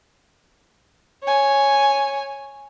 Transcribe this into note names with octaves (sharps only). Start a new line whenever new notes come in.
C#5 G#5